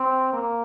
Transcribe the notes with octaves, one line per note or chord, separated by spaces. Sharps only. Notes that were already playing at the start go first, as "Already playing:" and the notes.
Already playing: C4
A#3